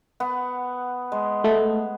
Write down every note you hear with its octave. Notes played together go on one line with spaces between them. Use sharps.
B3 F#5
G#3
A3